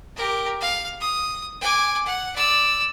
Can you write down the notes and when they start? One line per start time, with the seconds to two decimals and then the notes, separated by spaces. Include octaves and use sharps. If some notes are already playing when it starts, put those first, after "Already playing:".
0.16 G4 A#4
0.61 F5
1.01 D#6
1.61 G#5 D6
2.06 F#5
2.36 D5 E6